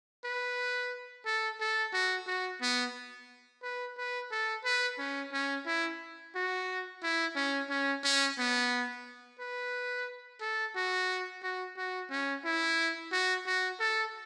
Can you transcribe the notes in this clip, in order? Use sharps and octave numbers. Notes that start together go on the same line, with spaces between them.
B4
A4
A4
F#4
F#4
B3
B4
B4
A4
B4
C#4
C#4
E4
F#4
E4
C#4
C#4
C#4
B3
B4
A4
F#4
F#4
F#4
C#4
E4
F#4
F#4
A4